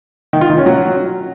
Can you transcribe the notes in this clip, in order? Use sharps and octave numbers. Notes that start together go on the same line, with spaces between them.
D#3
F4
D#3
C#4
F#3